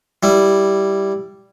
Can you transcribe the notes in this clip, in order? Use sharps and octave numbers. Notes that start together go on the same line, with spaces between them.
G3 E4